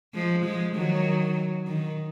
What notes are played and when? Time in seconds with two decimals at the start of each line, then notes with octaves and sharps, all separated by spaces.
0.14 F3 G#3
0.45 F3 G#3
0.75 D#3 F#3
1.67 D#3